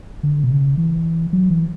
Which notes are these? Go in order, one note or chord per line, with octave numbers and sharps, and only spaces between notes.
D3
B2
C#3
E3
F#3
E3